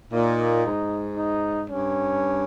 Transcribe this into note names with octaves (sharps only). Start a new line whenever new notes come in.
A#2 D#4
G#2
D#4
G2 C#4